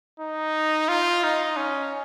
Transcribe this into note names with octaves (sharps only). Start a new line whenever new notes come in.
D#4
F4
D#4
C#4